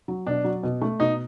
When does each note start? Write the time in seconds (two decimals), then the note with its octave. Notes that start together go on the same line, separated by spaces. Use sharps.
0.08 F#3
0.27 B2 D4
0.44 F#3
0.63 B2
0.81 A3
1.00 B2 D#4